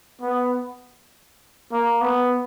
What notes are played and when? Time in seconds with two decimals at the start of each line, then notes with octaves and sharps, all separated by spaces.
0.21 B3
1.72 A#3
2.01 B3